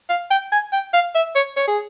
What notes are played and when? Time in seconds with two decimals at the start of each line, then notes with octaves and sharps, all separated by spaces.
0.10 F5
0.30 G5
0.52 G#5
0.73 G5
0.93 F5
1.15 E5
1.35 C#5
1.57 C#5
1.68 G#4